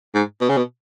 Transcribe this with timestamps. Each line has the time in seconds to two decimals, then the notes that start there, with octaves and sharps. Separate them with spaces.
0.14 G#2
0.41 B2
0.49 C#3
0.57 B2